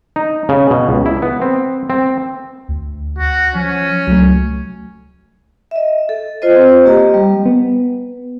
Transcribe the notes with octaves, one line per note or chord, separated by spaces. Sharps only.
D#4
C#3
B2
C#2
E4
B3
C4
C4
D2
F#4
F3 C#4
C#2 F#3 A3
D#5 E5
A4
F4 C5 D#5
C4 C5
A#3 G4 D#5 A#5
G3
B3